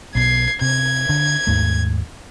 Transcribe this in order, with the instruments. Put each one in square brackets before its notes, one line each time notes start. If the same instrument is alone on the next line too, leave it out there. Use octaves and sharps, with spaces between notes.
[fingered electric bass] B1 B2 [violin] G#6 C7
[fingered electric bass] C3 [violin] G#6
[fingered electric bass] D3
D#2 G#2 A3